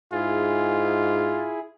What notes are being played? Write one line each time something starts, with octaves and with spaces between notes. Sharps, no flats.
G#2 E4 F4 G#4